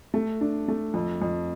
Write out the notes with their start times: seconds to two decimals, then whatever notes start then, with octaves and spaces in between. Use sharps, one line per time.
0.14 A3
0.41 D4
0.68 A3
0.94 F2
1.22 F2